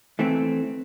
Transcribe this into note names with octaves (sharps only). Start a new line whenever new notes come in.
E3 A3 C4